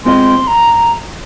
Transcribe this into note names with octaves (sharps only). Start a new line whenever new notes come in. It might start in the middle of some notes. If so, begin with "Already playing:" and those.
G#3 C4 F4 G#4 D#5 C6
A#5